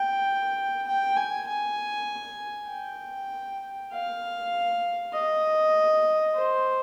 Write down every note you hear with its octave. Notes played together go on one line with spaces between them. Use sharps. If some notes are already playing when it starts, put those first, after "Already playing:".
Already playing: G5
G5
G#5
G#5
G5
F5
D#5
C5